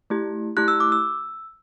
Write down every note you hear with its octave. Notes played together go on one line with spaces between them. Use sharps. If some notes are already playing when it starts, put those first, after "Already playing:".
A3 E4 G4
A3 E4 G4 F#6
E6
D6
E6